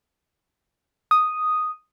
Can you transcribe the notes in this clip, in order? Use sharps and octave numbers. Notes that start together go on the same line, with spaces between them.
D#6